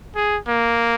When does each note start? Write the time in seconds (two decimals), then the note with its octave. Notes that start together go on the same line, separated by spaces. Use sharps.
0.16 G#4
0.47 A#3